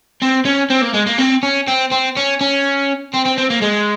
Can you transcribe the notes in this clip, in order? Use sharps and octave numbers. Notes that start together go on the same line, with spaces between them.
C4
C#4
C4
A#3
G#3
A#3
C4
C#4
C4
C4
C#4
C#4
C4
C4
C4
A#3
G#3